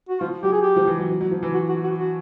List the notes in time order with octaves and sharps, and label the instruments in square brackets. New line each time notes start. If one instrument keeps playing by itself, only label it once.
[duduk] F#4
[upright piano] F3 [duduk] F4
[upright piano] F#3 [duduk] G4
[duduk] G#4
G4
[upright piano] F3
E3
F#3
F#3
F#3
F3
E3
[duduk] F#4
F#4
F#4
F#4